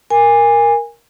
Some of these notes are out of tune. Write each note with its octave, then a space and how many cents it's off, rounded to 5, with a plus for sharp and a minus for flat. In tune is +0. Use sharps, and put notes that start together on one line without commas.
A#4 +0 G#5 -20